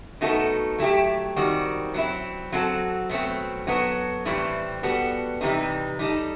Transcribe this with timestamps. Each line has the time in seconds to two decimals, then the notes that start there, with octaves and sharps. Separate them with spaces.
0.21 B2 A3 D#4 F#4 A4
0.78 F#3 A3 E4 G4
1.36 D#3 G3 C4 F#4
1.94 F#3 C4 E4
2.52 F#3 C4 F#4 A4
3.09 B2 F#3 A3 C4
3.67 F#3 B3 F#4 A4
4.25 A2 E3 G3 C4
4.83 G3 B3 F#4 A4
5.41 C3 E3 G3 D#4
5.99 G3 D#4 A4